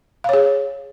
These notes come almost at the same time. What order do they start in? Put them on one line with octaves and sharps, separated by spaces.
F5 C#5 G#4